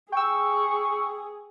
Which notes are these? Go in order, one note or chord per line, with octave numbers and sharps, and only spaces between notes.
G#4 G5 C#6 E6